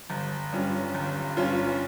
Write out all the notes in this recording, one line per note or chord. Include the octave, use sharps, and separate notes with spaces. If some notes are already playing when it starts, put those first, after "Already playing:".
G1
G2 G3 C#4 F4
G1
G2 G3 C#4 F4